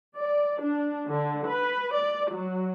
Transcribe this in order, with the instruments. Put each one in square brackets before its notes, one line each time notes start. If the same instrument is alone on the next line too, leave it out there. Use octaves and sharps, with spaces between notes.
[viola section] D5
D4
D3
B4
D5
F#3